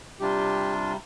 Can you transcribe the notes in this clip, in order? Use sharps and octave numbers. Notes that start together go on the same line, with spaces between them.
C3 G3 D4 F4 G4